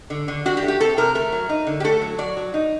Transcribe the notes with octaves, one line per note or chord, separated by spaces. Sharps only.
D3
D3
D4 F#4
G4
A3
G4
C4 A4
C3 A#4
A3 A#4
F#3
D#4
D3
G4
A3 A4
F#3
F#3 D5
F#3
D#4